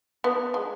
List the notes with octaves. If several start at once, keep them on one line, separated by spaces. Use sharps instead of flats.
B3
G#3